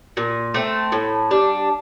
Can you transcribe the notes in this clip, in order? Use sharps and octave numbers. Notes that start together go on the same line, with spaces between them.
A#2
A3 C4
A2
G3 D4